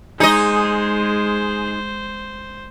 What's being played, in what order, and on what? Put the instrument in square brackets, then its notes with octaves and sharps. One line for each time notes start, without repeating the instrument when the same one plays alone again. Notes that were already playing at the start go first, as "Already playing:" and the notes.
[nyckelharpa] G#3 [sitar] D#4 D#5 [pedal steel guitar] G#4 [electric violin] C5